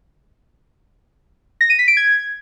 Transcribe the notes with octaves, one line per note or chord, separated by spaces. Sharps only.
A#6
D#7
B6
D7
G#6